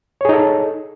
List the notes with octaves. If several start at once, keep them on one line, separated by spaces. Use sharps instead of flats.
D#4 G#4 A4 C#5